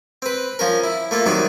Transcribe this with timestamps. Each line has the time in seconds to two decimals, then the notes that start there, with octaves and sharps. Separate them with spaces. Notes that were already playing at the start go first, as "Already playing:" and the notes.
0.22 C4 B4
0.59 F3 C#4 A#4
0.83 E4
1.11 A3 A#3 F4
1.26 C3 D#3 F#3 G3 D#4 F#4